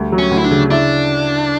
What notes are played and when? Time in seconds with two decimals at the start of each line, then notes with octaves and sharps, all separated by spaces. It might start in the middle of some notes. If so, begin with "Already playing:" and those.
Already playing: D2 G3
0.12 F#3
0.18 C#4
0.31 D2
0.37 E4
0.44 D4
0.51 C#3
0.70 D4 E4